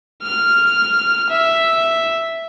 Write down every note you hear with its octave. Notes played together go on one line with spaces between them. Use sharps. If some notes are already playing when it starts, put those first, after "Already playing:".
F6
E5